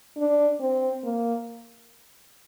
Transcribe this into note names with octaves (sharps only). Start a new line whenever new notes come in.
D4
C4
A#3